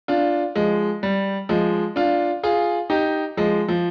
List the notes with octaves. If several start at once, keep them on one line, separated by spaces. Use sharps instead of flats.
D4 F4
F3 G#3
G3
F3 G#3
D4 F4
F4 G#4
D#4 G4
F3 G#3
F3